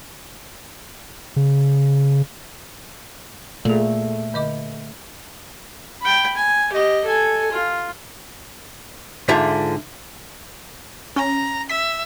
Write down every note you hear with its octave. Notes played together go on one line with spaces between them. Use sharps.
C#3
A#2 A3 G#4 A4
D3 D#5 D6
G5 B5
G#5
G4 D#5
A4 G#5
F4
G#2 D3 F4 E5 A5
C#4 A#5
E5 B6